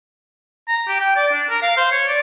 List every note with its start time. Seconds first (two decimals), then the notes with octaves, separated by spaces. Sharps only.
0.68 A#5
0.87 G4
1.00 G5
1.16 D5
1.32 D4
1.50 A#4
1.62 F5
1.77 C5
1.92 C#5
2.08 D5